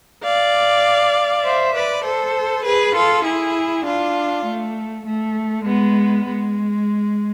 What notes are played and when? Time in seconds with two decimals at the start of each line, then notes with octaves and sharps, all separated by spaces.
0.23 D5 F5
1.44 C5 E5
1.74 B4 D5
2.04 A4 C5
2.64 G#4 B4
2.94 F4 A4
3.24 E4 G#4
3.84 D4 F4
4.45 A3
5.05 A3
5.65 G#3 B3
6.25 G#3